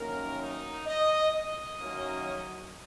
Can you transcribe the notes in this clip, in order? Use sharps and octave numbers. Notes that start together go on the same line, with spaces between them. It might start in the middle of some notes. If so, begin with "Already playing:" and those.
Already playing: F#2 D#3 A#3 C#4 A#4
D#4
D#5
D#5
F#2 D#3 F#3 A#3 C#4